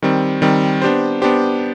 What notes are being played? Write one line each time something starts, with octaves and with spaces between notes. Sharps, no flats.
D#3 G3 C4
D#3 G3 C4
B3 D4 G4 C5
B3 D4 G4 C5